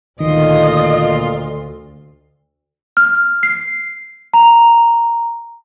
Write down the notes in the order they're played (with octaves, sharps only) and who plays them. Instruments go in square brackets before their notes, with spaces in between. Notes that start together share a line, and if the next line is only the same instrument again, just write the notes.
[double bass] D2 [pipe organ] A#2 F4 C6 [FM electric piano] D#3 [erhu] D#5
[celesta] F6
C7
A#5